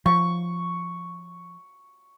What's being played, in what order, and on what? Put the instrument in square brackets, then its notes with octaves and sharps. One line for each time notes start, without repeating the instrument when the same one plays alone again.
[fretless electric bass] F3 [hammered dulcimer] C#6